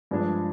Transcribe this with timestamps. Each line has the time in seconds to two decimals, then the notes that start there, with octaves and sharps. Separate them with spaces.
0.11 G2 F3 G#3 D4 G#4